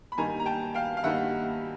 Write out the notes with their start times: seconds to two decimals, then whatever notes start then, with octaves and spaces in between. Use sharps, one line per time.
0.12 B5
0.18 G2 D#3 G3 A#3 D#4 G#5 A#5
0.40 A#5
0.46 G5 A5
0.74 F5 G5
0.97 F5
1.04 G2 D#3 G3 A#3 D#4 E5 F#5